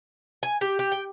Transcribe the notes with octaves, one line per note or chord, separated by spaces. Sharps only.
G#5
G4
G4
G5